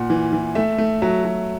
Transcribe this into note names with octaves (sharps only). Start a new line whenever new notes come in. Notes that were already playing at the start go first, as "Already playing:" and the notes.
Already playing: A#2 F#5
E3
E3
A3 E5
A3
F#3 E5
F#3